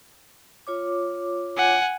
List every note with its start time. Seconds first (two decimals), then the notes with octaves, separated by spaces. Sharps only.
0.67 F4 C#5 D6
1.57 F#5 G#5